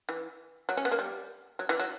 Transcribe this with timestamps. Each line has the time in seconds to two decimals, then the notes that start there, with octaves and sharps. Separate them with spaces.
0.09 E3
0.69 F#3
0.77 C#4
0.85 B3
0.91 A#3
0.99 G3
1.59 F#3
1.69 E3
1.80 F#3